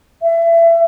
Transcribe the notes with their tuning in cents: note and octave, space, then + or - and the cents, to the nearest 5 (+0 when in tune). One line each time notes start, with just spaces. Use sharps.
E5 +30